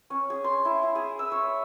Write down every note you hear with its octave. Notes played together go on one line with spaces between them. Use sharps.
C#4
G#4
C6
E4
E4
G#4
E6
C#5